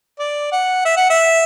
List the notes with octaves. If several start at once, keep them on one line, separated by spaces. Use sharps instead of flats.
D5
F#5
E5
F#5
E5